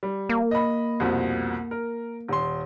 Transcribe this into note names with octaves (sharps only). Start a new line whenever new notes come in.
G3
A#3
D#5 B5
C2 F2 B2
A#4
D#1 C6